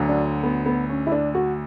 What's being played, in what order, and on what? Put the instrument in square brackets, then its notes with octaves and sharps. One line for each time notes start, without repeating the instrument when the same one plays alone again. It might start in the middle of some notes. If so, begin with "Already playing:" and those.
Already playing: [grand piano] D2 D3 F#3
[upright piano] D4
B3
B3
C#4
E4
D4
F#4